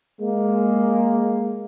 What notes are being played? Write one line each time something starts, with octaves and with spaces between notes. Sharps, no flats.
G#3 A#3